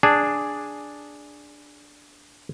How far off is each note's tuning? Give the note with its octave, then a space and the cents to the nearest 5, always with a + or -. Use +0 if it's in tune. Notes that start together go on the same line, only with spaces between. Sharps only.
D4 +0 G#4 +0